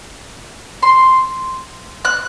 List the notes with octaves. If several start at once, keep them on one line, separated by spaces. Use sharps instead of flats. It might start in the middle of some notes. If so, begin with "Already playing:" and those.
C6
F#6